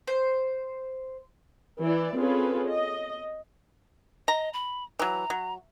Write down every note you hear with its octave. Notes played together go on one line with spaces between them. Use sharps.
C5
E3 E4 D5
C4 C#4 F4 G#4 A4 B4
D#5
D#5 A#5
B5
E3 F#3 A#5
F#3